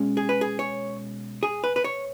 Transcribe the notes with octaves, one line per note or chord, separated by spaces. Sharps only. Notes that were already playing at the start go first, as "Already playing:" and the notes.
Already playing: B2 G#3 C#4
G#4
B4
G#4
C#5
G#4
B4
B4
C#5